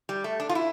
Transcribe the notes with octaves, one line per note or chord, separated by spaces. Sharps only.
G3
A3
D4
F4
E4